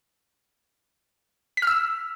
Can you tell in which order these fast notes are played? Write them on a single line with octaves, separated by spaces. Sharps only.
B6 F6 E6